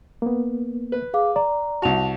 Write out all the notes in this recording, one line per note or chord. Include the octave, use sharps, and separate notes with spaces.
A#3 B3
B4
G#4 F5 D6
D5 A#5
C2 F#4 A5 F7